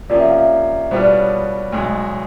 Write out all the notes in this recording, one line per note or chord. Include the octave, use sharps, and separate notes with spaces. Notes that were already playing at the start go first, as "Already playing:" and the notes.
C3 F3 A#3 C#4 F4 D5
E5
F5
E5
B2 G3 B3 D4 F4 C5
D5
C#5
B1 B2 G#3